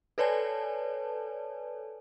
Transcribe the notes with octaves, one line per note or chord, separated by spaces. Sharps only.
A4 B4 C#5 D5 G#5 A5